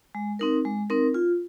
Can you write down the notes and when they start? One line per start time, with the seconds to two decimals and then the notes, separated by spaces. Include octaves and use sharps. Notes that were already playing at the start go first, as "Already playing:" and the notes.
0.15 G#3
0.39 C4 D#4 A#4
0.65 G#3
0.90 C4 D#4 A#4
1.14 F4